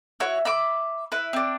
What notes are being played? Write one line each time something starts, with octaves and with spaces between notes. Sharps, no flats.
E4 F#4 C#5
E5 B5 D6
E4 B4
C4 D4